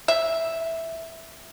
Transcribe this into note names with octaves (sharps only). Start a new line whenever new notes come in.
E5